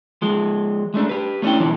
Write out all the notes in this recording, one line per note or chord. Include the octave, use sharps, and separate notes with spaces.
F3 G#3
G#3 A3 D4
G4 B4
A3 A#3 C#4 D4 E4 G5
B2 D3 E3 F3